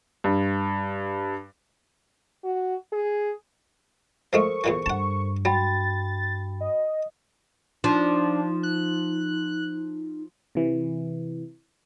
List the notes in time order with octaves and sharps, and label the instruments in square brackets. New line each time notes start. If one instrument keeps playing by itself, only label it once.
[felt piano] G2
[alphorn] F#4
G#4
[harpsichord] F3 G#3 A3 [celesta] A4 A#4 C5 [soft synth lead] C#6
[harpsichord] E2 A#2 E3
[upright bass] G2 [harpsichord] F#5 A5
[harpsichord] F#3 [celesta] F#4 G5 B5 [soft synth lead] A6
[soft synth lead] D#5
[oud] F3 [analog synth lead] D4 [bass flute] D#4
[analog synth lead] F#6
[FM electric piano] C3 E3